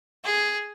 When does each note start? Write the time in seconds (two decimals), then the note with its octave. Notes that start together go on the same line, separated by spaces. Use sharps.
0.24 G#4